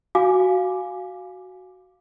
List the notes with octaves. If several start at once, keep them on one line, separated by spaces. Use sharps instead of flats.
F#4 F5 G#5 D6